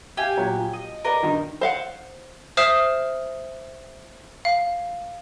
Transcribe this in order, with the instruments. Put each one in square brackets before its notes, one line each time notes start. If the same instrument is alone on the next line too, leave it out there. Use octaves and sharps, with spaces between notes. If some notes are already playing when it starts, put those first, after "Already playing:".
[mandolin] G4 G#5 [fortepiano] E5 F5
[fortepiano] A#2 F#3
F3
[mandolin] D#5
[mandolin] A#4 D#5 [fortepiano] B4 D5
[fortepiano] G2 D#3 D#4
[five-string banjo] C5 F5 F#5
[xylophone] C5 E5 D#6 F6 C7 E7
F5